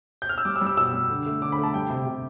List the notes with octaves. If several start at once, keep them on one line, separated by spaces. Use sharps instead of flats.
G6
F6
E6
G3 D6
E6
G3
E6
B2 E6
G3
D3
A3
D3 D6
B5
A3
A5
G3 G5
C3
C3